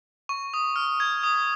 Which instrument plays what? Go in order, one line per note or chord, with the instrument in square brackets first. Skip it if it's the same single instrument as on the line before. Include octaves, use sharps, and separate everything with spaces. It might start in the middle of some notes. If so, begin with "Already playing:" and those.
[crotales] C#6
D#6
F6
G#6
D#6